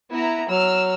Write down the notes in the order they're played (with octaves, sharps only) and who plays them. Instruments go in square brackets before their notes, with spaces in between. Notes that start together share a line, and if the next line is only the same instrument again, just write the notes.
[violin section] B3 E4 A#5
[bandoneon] F#3 [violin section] E6 F6